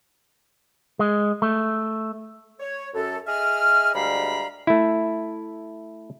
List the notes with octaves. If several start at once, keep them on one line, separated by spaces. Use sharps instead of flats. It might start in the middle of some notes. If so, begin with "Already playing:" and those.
G#3
A3
C#5
F#2 A4
G#4 D#5 E5 F6
D2 G3 G#3 F5 A#5 B5
A3 E4